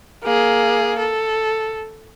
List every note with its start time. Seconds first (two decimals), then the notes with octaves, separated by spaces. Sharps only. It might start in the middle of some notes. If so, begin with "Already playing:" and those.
0.24 A#3 G#4
0.98 A4